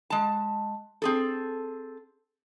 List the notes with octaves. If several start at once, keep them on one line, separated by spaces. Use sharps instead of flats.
G#3 A5
C4 G#4 A4